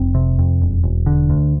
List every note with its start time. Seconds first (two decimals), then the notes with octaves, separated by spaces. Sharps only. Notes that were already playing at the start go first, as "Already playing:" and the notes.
Already playing: F1 C4
0.15 C3
0.39 F2
0.62 E1
0.84 E1
1.06 D3
1.30 D2